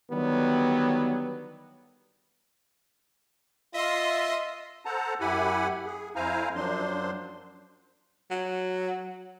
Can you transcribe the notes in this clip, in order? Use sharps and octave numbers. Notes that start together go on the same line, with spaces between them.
D3 D#3 F#3 G3 B3
F4 D#5 E5 C6
A4 C5 F#5 A5 A#5
F#2 E4 G4 F#5 G#5 B5
G#4
F2 E4 C5 F5 G#5 A#5
F#2 F3 F#3 D4 C5 C6
F#3